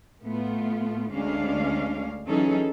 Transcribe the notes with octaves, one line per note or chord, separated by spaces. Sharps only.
A2 A3 B3 F4
D2 G#3 C#4 D4 F5
E3 F#3 C#4 D#4 G#4 A4